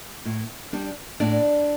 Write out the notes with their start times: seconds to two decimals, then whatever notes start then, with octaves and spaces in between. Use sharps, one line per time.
0.25 A2
0.73 G3 D4
1.20 A2 D4 D5